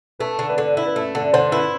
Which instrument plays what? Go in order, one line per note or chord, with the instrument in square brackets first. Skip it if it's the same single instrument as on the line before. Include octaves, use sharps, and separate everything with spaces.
[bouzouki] A3 [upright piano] B4
[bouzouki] D3
[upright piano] B4
[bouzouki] D3 [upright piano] A4
[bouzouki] E4
[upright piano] B4
[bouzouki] A3 [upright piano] A4
[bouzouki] D3 [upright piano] A4
[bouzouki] D3 [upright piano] C5
[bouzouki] E4 [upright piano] B4